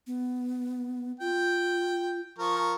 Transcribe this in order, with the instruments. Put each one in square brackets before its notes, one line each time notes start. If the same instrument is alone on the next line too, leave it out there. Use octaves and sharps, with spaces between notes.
[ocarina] B3
[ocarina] F4 [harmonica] G5
[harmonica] F3 A#4 C#6